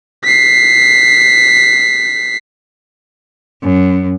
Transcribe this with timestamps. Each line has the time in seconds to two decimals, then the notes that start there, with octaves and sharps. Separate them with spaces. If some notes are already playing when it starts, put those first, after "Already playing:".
0.24 B6 C7
3.63 F#2